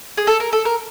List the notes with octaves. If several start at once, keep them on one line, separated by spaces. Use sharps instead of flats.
G#4
A4
A#4
A4
A#4